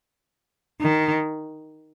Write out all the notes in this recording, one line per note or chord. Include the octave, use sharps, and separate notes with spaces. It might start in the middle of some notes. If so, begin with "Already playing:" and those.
D#3